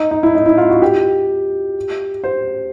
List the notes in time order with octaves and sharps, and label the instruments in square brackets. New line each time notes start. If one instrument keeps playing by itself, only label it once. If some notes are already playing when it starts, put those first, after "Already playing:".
Already playing: [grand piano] D#4
D#4
E4
D#4
E4
F4
F#4
G4
C5